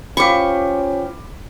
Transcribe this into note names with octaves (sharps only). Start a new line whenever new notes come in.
C#4 F4 G4 C5 B5 C#6 D6 B6